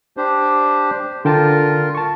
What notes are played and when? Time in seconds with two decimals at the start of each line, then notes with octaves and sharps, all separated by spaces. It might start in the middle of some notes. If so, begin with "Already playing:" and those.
0.17 D4 G4 C5
1.25 D3 F4 A#4 G5 A5
1.95 A5 C#6